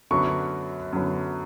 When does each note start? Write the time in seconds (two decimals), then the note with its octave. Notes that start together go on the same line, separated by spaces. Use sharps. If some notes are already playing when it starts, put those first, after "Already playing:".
0.11 F#2 D3 F#3 B3 C#6
0.93 F#2 D3 F#3 B3